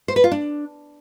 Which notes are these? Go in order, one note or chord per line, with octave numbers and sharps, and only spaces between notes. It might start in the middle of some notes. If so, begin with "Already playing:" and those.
C5
B4
F4
D4